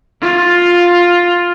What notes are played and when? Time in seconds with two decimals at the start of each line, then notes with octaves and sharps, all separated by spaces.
0.21 F4